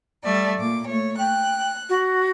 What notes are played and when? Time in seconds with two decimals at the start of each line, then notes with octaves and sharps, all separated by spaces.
0.23 G3 A3 D5
0.59 A#2 D6
0.89 A3 C#5
1.18 G5 F#6
1.89 F#4